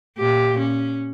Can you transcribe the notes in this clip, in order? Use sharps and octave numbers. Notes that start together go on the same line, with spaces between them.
A#2 G4
C#4